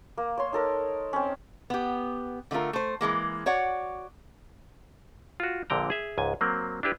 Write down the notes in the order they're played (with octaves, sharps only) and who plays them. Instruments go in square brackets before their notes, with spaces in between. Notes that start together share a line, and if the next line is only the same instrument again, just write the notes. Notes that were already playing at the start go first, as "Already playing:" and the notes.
[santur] A#3
C#5 C6
D#4 A4 A#4
C4 C#4
[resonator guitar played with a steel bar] B3 G4
D3 A3 D4 F4 A#4
A3 C5
E3 F3 G#3 A#3
F#4 C#5 D5 F#5
[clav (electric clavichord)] F4 F#4
A#1 A#2 D3 G5 A#5
G#4 E5
C#2 G#2 G#5
F#3 A#3 C4
D4 E4 G4 B4